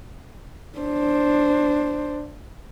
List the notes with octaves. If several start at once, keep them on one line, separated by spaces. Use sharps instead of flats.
D4 C5